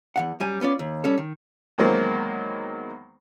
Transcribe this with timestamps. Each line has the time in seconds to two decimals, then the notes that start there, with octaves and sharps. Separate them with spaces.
0.16 E2 G#2 F#5
0.40 F#2 G3 G#5
0.61 B3 C#4 F4 D5
0.79 D#2
1.04 G3 C#4 A4
1.18 D#3
1.78 E2 D#3 F#3 G#3 A#3 C4